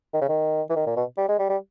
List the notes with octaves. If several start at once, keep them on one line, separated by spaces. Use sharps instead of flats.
D#3
C#3
D#3
E3
D#3
A#2
B2
G3
G#3
G3
G3